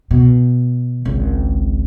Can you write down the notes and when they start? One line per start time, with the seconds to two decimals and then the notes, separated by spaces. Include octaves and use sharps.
0.11 B2
1.05 G#1 C#2